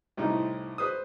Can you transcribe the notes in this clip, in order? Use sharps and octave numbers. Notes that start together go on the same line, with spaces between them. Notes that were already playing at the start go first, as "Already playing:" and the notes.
C2 A2 D#4
B4 C5 D#6